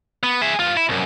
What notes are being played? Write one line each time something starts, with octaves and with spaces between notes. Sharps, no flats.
B3
G#4 E5
G2 F4
E4
C2 F#2